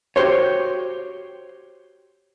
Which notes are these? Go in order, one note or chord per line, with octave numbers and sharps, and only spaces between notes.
F#4 G4 A#4 C5 C#5